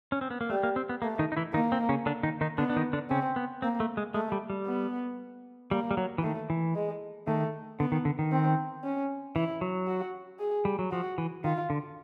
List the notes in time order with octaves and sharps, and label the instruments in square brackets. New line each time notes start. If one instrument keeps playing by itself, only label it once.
[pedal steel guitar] C#4
C4
B3
A#3
[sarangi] G3 [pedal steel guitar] A3
[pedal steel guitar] A#3
C4
B3
[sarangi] A3 [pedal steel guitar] A#3
[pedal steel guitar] D#3 D#4
D#4
E3 E4
[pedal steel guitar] D#3 D#4 [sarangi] A#3
[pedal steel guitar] C4
C#3 C#4
D3 D4
D#3 D#4
D#3 D#4
[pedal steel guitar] D3 D4 [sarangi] B3
[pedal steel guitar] D4
D#3 D#4
D3 D4
[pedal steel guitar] C#3 C#4 [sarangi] C4
[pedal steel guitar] B3
[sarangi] A#3 [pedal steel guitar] C4
[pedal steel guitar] A3
G#3
[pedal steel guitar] G#3 [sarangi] A3
[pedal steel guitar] G3
G3
[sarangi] B3
[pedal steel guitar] G3 [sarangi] A#3
[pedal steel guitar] G3
F#3
E3
[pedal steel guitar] D#3 [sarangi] A3
[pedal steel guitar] E3
[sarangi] G#3
[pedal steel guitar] D#3 [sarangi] A3
[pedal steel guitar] D3 [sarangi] B3
[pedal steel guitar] D#3
D3
D#3
[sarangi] C4
C#4
[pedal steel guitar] E3 [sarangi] E4
[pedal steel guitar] F#3
[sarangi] F#4
G#4
[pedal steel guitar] G3
F#3
[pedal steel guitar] F3 [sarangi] F#4
[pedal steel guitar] E3
[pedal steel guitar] D#3 [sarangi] F4
[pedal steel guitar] D3